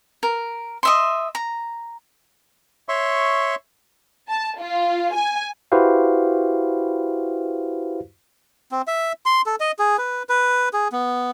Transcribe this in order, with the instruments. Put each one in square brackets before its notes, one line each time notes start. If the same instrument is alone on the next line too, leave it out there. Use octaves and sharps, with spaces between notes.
[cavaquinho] A#4
D#5 E5 C6
A#5
[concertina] C#5 E5 C6 C#6
[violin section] A5
F4
G#5
[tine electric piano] E4 F#4 G4 B4 C5 F5
[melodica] C4
E5
C6
A4
D#5
G#4
B4
B4
G#4
B3